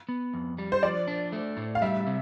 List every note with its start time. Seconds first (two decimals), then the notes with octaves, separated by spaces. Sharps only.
0.09 B3
0.34 F2
0.59 G3
0.72 C5
0.82 F3 D5
1.08 D4
1.32 A3
1.57 A2
1.75 F5
1.82 G3 E5
2.07 C3